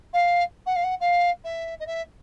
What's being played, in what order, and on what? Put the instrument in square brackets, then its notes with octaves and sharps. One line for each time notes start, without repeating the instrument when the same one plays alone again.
[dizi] F5
F#5
F5
F#5
F5
E5
D#5
E5